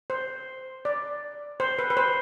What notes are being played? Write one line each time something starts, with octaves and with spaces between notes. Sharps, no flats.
C5
D5
C5
B4
B4
C5